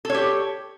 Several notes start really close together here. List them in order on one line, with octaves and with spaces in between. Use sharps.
A4 C#5 G4